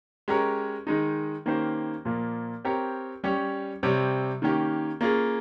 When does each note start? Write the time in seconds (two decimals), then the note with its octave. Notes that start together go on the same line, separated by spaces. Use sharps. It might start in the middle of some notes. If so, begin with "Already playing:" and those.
0.28 G#3 C#4 G4 A#4 C#5
0.87 D#3 G#3 D#4
1.46 D#3 A#3 C#4 G4 C5
2.05 A#2 F3 A#3
2.65 C4 G4 A#4 C#5
3.24 G3 C#4 G4 C#5
3.83 C3 G3 C4 G4 C#5
4.42 D#3 A#3 C#4 G4
5.01 A#3 C#4 F4 G#4